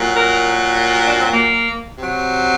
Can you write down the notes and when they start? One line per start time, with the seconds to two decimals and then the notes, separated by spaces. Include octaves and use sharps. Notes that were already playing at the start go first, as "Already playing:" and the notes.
Already playing: A#2 F#3
0.15 A#4
0.94 A#4
1.06 D4
1.19 C4
1.33 A#3
1.98 C3 F#3